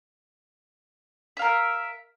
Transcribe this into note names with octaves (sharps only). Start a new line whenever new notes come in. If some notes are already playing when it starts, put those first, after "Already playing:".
A#4 E5 F5